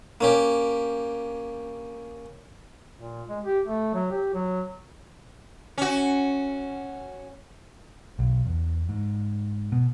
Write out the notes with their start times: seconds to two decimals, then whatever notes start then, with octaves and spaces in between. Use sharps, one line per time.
0.21 A#3 C#4 G4
2.97 A#2
3.29 G#3
3.44 G4
3.66 A3
3.94 F#3
4.11 G4
4.34 F#3
5.78 C#4 F#4
8.19 B1
8.46 E2
8.89 G#2
9.72 B2